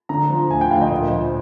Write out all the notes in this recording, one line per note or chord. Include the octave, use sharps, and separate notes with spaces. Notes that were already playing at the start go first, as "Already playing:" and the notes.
D3 A#5
F3
D2 G#5
G5
D2 F5
D#5
A#2
F3